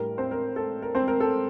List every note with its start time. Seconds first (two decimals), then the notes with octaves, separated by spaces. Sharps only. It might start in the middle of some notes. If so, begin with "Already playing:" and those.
Already playing: A2 G3 D4 A#4
0.18 C4 C5
0.31 A#4
0.56 A4
0.82 A#4
0.95 C4 C5
1.08 A#4
1.20 A4